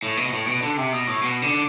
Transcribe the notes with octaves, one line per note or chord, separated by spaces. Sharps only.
A2
B2
B2
A2
B2
D3
C3
B2
A2
B2
D3